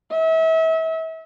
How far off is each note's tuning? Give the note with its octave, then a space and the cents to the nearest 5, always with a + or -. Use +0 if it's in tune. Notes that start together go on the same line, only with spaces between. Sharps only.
E5 -35